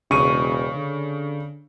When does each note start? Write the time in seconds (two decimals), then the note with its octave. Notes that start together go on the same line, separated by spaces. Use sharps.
0.11 E1 C#3 C#6 D#7
0.75 D3